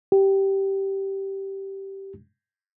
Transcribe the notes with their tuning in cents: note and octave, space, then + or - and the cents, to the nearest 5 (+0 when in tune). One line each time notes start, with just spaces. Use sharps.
G4 -10